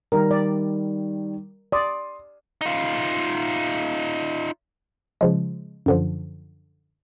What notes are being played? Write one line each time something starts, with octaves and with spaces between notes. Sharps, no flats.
D#3 G3 A#4
D5
D5 C6 D#6
D#4 F4
C#3 F3 G#3
F#2 D3 F3